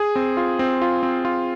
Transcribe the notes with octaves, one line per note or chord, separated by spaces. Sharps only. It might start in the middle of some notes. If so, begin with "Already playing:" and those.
Already playing: G#4
C4
F4
C4
F4
C4
F4